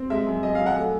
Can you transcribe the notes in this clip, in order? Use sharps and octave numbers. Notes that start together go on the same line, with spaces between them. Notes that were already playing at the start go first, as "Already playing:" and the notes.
Already playing: C4
G#3 E5
F#2
F#2 D#5
F5
F#2
F#5
A3